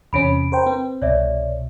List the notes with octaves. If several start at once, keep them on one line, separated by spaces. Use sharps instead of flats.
E2 C3 C#4 B5 D7
A#4 C5 G5
C4 B4
C2 B2 C#5 D5 E5